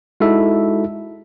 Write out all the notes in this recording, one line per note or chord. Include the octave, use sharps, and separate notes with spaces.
G#3 D#4 E4 F#4 A4 E5